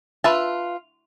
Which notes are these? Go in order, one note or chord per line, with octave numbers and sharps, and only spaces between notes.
F4 B4 E5 A5